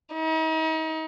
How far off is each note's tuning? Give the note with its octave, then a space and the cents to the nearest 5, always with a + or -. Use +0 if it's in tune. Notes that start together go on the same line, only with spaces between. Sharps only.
D#4 +40